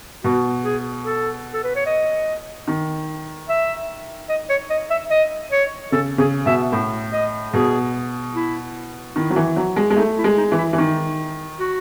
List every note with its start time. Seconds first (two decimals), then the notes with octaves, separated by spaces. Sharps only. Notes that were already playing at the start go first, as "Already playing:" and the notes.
0.24 B2 F#4
0.64 G#4
1.06 A4
1.53 A4
1.64 B4
1.75 C#5
1.86 D#5
2.68 D#3
3.49 E5
4.29 D#5
4.50 C#5
4.70 D#5
4.90 E5
5.10 D#5
5.51 C#5
5.92 C#3 A4
6.18 C#3 G#4
6.46 B2 E5
6.72 A2
7.13 D#5
7.53 B2 G#4
8.35 E4
9.16 D#3 E4
9.30 F#3
9.36 E3
9.56 F#3
9.76 G#3
9.90 G#3
9.97 A3 D#4
10.18 E4
10.24 G#3
10.37 D#4
10.52 E3
10.58 E4
10.73 E3
10.78 D#3 D#4
11.59 F#4